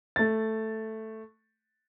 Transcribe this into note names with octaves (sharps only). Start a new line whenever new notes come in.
A3 A6